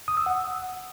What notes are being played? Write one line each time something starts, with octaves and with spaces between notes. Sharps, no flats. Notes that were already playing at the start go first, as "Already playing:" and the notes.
D#6
E6
F#5